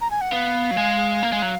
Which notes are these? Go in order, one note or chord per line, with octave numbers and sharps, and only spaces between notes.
A#5
G#5
F#5
B3 F5
F#3
G#3
A#3
G#3
F#3